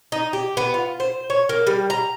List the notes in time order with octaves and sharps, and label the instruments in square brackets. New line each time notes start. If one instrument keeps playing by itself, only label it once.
[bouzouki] D#4
G4
B3
F4
C5
C#5
A#3
G3
A#5